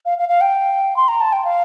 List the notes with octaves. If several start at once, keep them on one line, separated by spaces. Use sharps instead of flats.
F5
F5
F5
G5
C6
A#5
A5
G5
F5